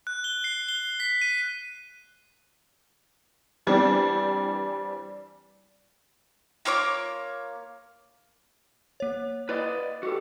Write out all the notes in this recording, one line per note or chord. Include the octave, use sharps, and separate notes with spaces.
F#6
G7
C7
G7
B6
D#7
E3 G3 C4 D4
A#3 F4 C#5 D6
A#3 C#5
E4 B4 D5 D#5
F#4 G4 A4